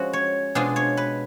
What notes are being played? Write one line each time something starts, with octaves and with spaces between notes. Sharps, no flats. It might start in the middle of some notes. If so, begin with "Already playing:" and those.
Already playing: F3 G#3 C#4 F#4
C#5
B2 G#3 D4 F4
C#5
B4